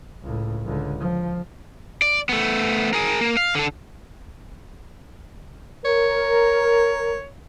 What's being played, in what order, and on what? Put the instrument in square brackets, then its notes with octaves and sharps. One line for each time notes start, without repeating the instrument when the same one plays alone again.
[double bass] C#2 A2
C#2 D3
F3
[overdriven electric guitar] D5
A3 B3
G#4 A#4
A#3
F5
D3 A4
[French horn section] A#4 [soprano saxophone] C#5